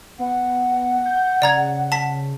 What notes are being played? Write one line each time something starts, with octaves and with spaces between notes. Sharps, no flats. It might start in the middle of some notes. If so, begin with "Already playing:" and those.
B3 F#5
G6
C#3 D5 A#5 G#6
A5 B6